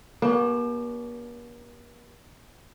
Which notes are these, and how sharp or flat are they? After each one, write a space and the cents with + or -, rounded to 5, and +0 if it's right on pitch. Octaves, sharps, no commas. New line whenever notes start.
A#3 +45 D4 -45 G4 +0